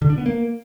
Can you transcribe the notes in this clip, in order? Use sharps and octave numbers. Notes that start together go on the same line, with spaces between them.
D3
D4
B3
A#3